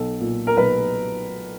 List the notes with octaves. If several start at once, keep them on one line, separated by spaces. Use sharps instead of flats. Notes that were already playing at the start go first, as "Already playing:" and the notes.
Already playing: B1 A4
A#2
A#4
B1 B4